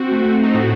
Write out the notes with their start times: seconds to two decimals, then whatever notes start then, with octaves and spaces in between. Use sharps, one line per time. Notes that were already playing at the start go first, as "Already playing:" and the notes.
Already playing: C4 F#4
0.11 A3
0.43 D#4
0.54 A2 F#4